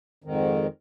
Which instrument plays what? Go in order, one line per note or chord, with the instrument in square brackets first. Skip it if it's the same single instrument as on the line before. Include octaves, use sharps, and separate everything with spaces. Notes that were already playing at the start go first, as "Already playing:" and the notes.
[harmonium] F2 G#2 D#3